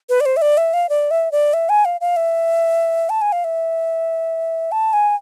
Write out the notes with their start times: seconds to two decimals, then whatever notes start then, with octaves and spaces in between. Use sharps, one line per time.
0.09 B4
0.20 D5
0.26 C5
0.37 E5
0.42 D5
0.57 E5
0.73 F5
0.89 D5
1.11 E5
1.32 D5
1.53 E5
1.69 G#5
1.85 F5
2.01 F5
2.16 E5
3.10 A5
3.21 G#5
3.32 F5
3.44 E5
4.72 A5
4.93 G#5